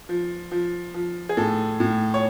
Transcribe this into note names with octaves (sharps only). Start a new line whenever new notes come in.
F3
F3
F3
G#4
A2 A4
A2
C#5